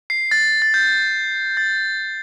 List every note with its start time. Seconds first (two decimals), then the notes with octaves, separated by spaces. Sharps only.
0.10 C7
0.31 A6
0.62 A6
0.74 G6
1.57 A6